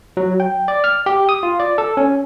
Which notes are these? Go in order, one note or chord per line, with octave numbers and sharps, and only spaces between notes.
F#3
G5
D5
F6
G4
D#6
F4
D5
A4
C#4